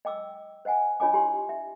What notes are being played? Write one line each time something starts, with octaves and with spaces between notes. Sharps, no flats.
D#5 G5 D6 E6
C5 D#5 F#5 G#5
D4 F4 C#5 D#5 G#5 D6
E4 G4 G#5 C6
E5